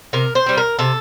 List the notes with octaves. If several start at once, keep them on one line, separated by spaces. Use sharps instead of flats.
C3 A#4
C5
G3 C4
A#4
C3 A4